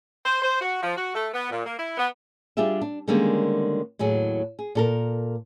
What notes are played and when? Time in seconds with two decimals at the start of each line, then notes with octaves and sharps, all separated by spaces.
0.25 C5
0.42 C5
0.61 F#4
0.83 F3
0.96 F#4
1.15 A3
1.33 B3
1.51 A#2
1.65 A#3
1.78 E4
1.98 B3
2.57 G3 D4 F4 G4 G#4 E5
2.82 D4
3.08 D3 D#3 G3 G#3 A#3 C#4
3.99 D#2 A2 F#3 G#4
4.59 G#4
4.75 A#2 A4 A#4